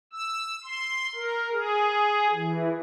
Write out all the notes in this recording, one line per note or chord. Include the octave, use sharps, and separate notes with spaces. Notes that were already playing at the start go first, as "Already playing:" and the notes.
E6
C6
A#4
G#4
E3